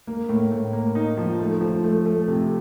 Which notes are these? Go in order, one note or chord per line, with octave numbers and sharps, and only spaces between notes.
A#3
A2
A2
A#3
D#4
F3
A3
F3
A3
A3
C3